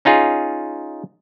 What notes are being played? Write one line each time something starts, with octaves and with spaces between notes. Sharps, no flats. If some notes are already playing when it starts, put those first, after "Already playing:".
C#4 D#4 F4 G#4